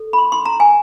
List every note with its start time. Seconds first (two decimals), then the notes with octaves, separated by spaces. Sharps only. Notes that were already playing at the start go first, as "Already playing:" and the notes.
Already playing: A4
0.13 B5
0.18 C6
0.32 C6
0.46 A#5
0.60 G#5